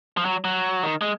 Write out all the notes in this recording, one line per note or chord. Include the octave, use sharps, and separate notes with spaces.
F3
F#3
F#3
D#3
G#3